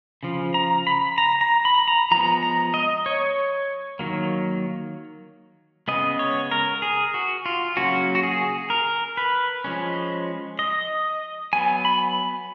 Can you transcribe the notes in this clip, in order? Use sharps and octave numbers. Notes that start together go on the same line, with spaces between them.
C#3 F3
A#5
B5
A#5
A#5
B5
A#5
F3 G#3 B3 A#5
A#5
D#5
C#5
D#3 F#3 A#3
C#3 G#3 B3 D#5
C#5
A#4
G#4
F#4
F4
C#3 F#3 A#3 C#4 F#4
F#4
G#4
A#4
B4
F3 G#3 C#4
D#5
F#3 B3 G#5
B5